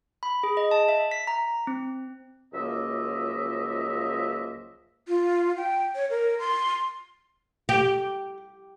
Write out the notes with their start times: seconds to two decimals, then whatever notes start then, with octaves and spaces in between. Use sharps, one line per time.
0.23 B5
0.43 G#4
0.57 D#5
0.71 A5
0.88 E5
1.11 B6
1.27 A#5
1.67 C4
2.52 C#2 F#2 F3 A#3 D#5 E5
5.08 F4
5.57 G5
5.95 C#5
6.10 A#4
6.39 C6
7.69 G4